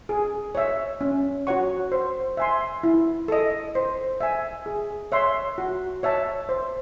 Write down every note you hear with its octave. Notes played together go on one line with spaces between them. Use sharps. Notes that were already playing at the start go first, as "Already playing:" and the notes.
G#4
C#5 E5
C#4
F#4 C#5 F#5 C#6
C5
E5 G#5 C6
E4
A4 D#5
C5
E5 G#5
G#4
C#5 E5 C6
F#4
C#5 E5 A5
C5